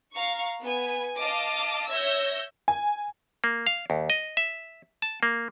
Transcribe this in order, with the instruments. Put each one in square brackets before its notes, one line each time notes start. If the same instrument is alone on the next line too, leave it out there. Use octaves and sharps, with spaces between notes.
[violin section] F5 A#5 C#6
B3 G#5
D#5 F5 A5 D6
C#5 E5 E6 G6 G#6 A#6
[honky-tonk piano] G#5
[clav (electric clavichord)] A#3
F5
D#2
D#5
E5
A5
A#3